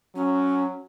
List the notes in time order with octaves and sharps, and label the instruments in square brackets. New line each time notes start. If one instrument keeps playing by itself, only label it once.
[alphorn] F#3 [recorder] C#4